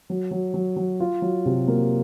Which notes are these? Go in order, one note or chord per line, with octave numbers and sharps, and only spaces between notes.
F#3
F#3
F#3
F#3
F4
F#3
C3
A#3